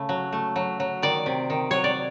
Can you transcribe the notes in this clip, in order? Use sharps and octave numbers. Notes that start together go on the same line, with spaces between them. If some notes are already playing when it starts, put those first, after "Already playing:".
Already playing: C#3 A3
F#3
A3
F#3
F#3
D#3 D5
C3
D#3
F#3 C#5
D5